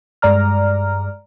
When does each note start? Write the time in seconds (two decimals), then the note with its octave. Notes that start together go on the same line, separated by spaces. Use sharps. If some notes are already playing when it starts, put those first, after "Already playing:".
0.22 G2 G#3 D5 A#5 F6